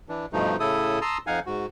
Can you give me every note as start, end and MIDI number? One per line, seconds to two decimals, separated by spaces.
0.09 0.26 52
0.09 0.26 62
0.33 0.56 43
0.33 0.56 47
0.33 0.56 53
0.33 0.56 57
0.33 0.56 63
0.60 0.99 45
0.60 0.99 49
0.60 0.99 64
0.60 0.99 69
0.60 0.99 87
1.01 1.18 81
1.01 1.18 82
1.01 1.18 84
1.01 1.18 87
1.01 1.18 88
1.27 1.40 41
1.27 1.40 63
1.27 1.40 77
1.27 1.40 78
1.27 1.40 80
1.46 1.66 44
1.46 1.66 66